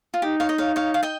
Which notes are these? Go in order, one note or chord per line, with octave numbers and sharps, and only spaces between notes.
F4
D#4 G4
C#5 F5
D#5
C#5 F5
C#5 F5
F5
D#5 G5